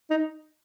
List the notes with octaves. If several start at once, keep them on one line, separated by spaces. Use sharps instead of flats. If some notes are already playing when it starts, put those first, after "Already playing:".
D#4